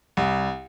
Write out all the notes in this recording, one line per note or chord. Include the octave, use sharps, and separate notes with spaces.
C2